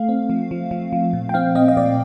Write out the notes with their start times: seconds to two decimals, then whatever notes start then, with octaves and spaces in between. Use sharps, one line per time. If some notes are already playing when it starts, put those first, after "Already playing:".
Already playing: A3 F5
0.09 C4
0.30 F3
0.51 F3
0.71 F3
0.93 F3
1.13 A#2
1.29 G5
1.34 C4 F5
1.55 C4 D#5
1.68 D#5
1.77 A#2 D5